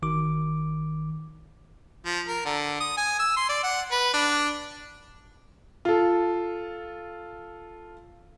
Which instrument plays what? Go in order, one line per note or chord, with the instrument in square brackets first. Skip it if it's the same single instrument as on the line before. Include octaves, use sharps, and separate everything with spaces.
[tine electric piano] G#1 D#3 D6
[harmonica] F3
A#4
D3
D#6
G#5
E6
C6
D5
F#5
B4
D4
[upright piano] F4 A4